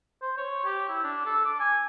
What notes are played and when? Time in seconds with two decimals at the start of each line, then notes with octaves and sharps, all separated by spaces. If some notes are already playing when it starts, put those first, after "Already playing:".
0.22 C5
0.38 C#5
0.65 G4
0.89 E4
1.04 D4
1.26 A4
1.46 D6
1.60 G#5